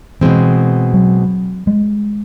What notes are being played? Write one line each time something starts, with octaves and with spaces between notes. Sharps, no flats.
B2 E3 G#3 C4
F#3
G#3